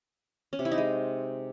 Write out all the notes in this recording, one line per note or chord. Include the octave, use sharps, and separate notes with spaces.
C#4
C3
E4
D#4
G#3